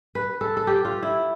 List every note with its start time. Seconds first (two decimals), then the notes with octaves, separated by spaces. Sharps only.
0.15 B4
0.41 A4
0.57 A4
0.67 G4
0.85 F4
1.03 E4